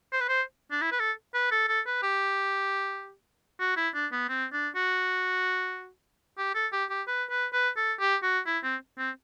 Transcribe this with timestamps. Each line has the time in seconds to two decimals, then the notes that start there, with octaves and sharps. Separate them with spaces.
0.13 C5
0.21 B4
0.28 C5
0.71 D4
0.82 E4
0.91 B4
1.00 A4
1.34 B4
1.51 A4
1.68 A4
1.86 B4
2.03 G4
3.60 F#4
3.76 E4
3.95 D4
4.12 B3
4.29 C4
4.52 D4
4.76 F#4
6.38 G4
6.55 A4
6.73 G4
6.90 G4
7.07 B4
7.30 B4
7.53 B4
7.77 A4
8.00 G4
8.23 F#4
8.46 E4
8.64 C4
8.98 C4